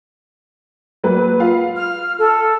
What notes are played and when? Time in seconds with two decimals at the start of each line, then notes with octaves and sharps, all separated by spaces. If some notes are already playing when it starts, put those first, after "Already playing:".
1.04 F#3 A#3 B4
1.40 F4 F5
1.76 F6
2.18 A4